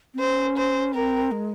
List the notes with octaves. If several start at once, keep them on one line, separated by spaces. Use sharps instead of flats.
C4
C#4 C5
C5
C4 A#4
G#3